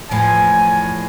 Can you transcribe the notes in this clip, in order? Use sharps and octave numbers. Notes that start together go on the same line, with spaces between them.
E2 A2 F3 G#5